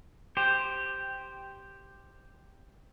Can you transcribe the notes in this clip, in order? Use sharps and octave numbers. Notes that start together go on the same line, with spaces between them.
G4 C5